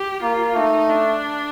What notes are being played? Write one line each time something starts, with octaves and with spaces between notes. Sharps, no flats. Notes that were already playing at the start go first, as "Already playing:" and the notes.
Already playing: G4
A#3 F4
A3 D#4
D4